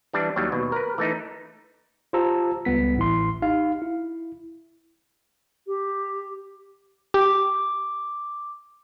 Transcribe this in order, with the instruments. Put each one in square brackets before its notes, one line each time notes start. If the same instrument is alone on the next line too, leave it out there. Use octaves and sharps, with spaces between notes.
[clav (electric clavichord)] E3 G3 D4
D#2 F#3 G3
D#2 B2
A#4 B4
E3 A3 D#4
[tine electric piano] F4 G4 C5 A5 A#5 E6
C#2 G3 B3 B6
A1 E4 C6
D#4 G4 F5
E4
[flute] G4
[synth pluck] G4 [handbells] D6